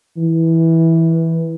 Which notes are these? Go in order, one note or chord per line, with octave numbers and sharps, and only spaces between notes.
E3